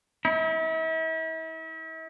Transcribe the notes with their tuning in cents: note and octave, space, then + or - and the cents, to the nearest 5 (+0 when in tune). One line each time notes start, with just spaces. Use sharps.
E4 -40